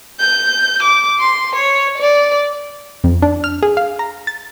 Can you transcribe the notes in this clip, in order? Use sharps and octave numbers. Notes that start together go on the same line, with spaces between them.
G6
D6
C6
C#5
D5
F2
D4
F6
G#4
F5
A#5
A6